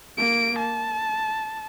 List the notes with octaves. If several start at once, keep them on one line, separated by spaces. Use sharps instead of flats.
A#3 D7
A5